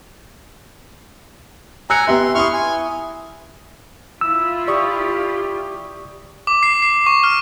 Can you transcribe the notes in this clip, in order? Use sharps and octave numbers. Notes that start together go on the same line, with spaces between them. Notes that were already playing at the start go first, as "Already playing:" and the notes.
G#5 A#5 E6 F#6 C#7
B3 G4 E5 C6
E4 C6 C#6 D#6 F6
G#5
E4 F4 E6
G4 D5 C#6 D#6
D6
C7
C7
C#6
F6